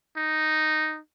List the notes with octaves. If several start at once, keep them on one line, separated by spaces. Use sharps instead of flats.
D#4